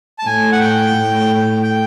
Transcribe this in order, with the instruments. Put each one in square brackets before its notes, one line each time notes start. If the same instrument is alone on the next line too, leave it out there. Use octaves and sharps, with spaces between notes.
[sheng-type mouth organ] A5
[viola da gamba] A2 [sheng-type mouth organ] G#5
[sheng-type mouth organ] F#5
G5
[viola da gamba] A2
[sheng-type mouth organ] G5